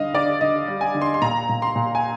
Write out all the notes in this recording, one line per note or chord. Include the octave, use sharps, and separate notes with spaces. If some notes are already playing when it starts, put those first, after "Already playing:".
Already playing: D3 G3 D#5 F5
D3 D5
D3 D#5
G3
G#5
D3
C6
C6
A#2 A#5
A#2
C6
A#2
G#5